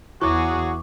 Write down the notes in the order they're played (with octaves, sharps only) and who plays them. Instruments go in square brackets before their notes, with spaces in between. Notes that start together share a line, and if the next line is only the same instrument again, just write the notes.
[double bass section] E2 [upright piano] E3 [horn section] F#3 F#4 G#4 [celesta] C#6 D6